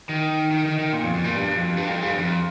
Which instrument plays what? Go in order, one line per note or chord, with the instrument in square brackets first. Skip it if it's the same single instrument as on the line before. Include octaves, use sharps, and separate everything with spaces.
[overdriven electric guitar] D#3
D#3
D#3
D#3
A#2
F2
F2
A#2
G2
F2
G2
F2
G2
G2
F2